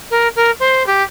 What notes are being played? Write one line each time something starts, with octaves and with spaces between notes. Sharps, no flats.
A#4
A#4
C5
G4